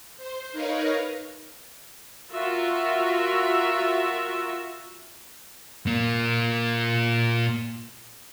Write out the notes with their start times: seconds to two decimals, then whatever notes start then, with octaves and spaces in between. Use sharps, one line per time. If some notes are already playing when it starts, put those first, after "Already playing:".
0.17 C5
0.53 D#4 A#4 B4 C#5 D#5 F5
2.32 F4 F#4 A#4 E5
5.87 A#2 A#3